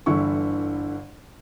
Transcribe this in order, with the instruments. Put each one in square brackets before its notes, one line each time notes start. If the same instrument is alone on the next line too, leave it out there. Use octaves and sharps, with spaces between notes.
[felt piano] G1 D3 E3 E4 C#6